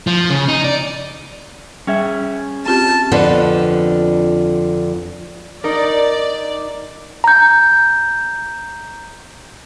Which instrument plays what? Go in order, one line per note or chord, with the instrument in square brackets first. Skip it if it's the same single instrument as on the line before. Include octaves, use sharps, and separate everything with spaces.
[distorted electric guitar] F3
C#3
D#4
D5
[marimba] G3 [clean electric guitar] C#4 G#4 E5
[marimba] C4 F4 G4 [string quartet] A5
[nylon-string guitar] F2 D3 F3 B3 D4 B4
[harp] D#4 A#4 [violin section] D5
[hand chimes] A#5 G6